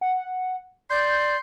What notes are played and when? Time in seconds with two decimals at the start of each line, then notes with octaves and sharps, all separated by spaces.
0.01 F#5
0.90 D5 C6 G6